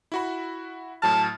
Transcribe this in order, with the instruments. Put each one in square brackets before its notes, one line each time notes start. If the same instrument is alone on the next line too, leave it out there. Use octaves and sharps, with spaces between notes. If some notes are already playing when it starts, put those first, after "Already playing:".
[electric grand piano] E4 F#4 B5
[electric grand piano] A2 F#3 F6 [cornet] A5